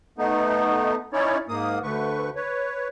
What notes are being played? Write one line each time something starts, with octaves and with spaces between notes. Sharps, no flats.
A3 B3 D#4
C#4 D#4 E4 C#5 D5
G#2 A#3 D#6
D2 D3 A3 B4 C#6
B4 C#5